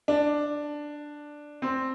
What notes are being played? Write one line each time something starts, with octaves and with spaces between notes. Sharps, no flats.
D4
C4